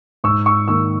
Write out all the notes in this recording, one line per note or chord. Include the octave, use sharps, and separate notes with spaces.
G#2 C#6 E6
C#6 E6
D#3 A#3 C#6 E6